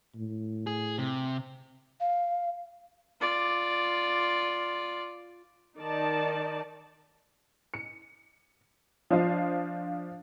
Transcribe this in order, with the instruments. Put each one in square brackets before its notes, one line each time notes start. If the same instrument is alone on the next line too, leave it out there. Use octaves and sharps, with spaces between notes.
[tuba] A2
[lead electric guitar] G#4
C3
[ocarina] F5
[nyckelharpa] F4 D5
[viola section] D#3 D#4 D5 A5
[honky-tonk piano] C#7
F3 D4 F4 C5 D#5 F5